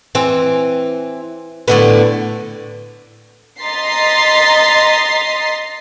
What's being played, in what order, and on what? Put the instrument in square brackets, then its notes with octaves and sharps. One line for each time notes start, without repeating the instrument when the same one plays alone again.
[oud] E3 C4
A2 D3 B3
[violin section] D#5 A#5 C6 A6 B6 C7